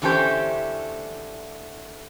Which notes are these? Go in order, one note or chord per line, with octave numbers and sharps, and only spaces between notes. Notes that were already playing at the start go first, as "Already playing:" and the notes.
D3 E3 A3 C#4 G4 C5